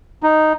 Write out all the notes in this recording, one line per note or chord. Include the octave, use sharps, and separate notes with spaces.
D#4